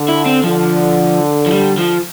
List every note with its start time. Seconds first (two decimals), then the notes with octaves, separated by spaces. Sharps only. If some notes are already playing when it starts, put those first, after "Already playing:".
Already playing: D3
0.09 E4
0.26 C4
0.44 D3 F3
1.46 F3
1.52 G3
1.78 F3